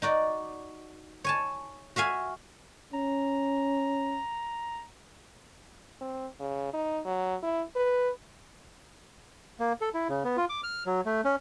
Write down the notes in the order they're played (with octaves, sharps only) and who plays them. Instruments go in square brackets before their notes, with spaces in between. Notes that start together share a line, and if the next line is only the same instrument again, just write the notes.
[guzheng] D#4 F#4 D5
C#5 G#5 A5
F#4 E5 F5 G#5
[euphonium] C#4 [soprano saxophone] A#5
[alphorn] C4
C#3
D#4
F#3
E4
B4
[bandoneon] A#3
A4
E4
C#3
B3
F4
D6
F6
F#3
A3
C#4